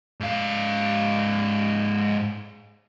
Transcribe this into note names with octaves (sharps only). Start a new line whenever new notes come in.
G#2 F5